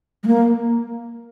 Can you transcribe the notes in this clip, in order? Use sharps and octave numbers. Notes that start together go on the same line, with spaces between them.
G#3
A#3